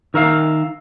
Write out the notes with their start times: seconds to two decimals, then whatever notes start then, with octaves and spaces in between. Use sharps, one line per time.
0.14 D#3 A#4 E5 F5